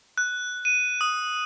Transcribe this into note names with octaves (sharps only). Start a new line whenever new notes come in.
F#6
D#7
D#6